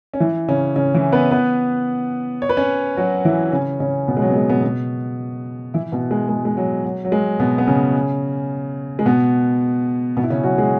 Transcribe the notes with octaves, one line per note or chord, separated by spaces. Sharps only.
C#4
E3 E4
C#3 C#4
C#3 C#4
E3 E4
B3 B4
B3 B4
C#5
B4
C#4 C#5
F#3 F#4
E3 E4
C#3 C#4
C#3 C#4
B2 B3
G#3
F#3
B3
G#3
B2 B3
B2 B3
E3 E4
B2 B3
G#3
G#3
G#3
F#3
F#3
F#3
G#3
B2 B3
B3
C#3 C#4
G#3
B2 B3
B2 B3
E4
C#3 C#4
F#3 F#4
G#3 G#4